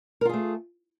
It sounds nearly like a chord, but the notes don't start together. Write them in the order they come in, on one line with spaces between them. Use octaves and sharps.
A#4 F4 G#4 A3